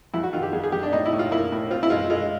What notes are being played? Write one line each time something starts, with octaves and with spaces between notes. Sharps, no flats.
F2 E4
F#4
D#3 F4
G4
F2 G#4
G#4
F2 G4
D4
A2 D#4
E4
A2
F4
A#3 E4
A2
C4 F4
E4
G#3 F4
G#3 F4